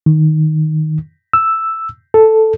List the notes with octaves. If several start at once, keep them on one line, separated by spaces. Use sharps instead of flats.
D#3
E6
A4